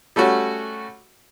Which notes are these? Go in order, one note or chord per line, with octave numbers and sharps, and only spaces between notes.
G3 A3 C#4 F#4